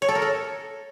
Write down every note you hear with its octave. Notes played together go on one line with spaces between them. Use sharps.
C#5
A4
A#4
A4